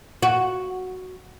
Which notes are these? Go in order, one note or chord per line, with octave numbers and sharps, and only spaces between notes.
F#4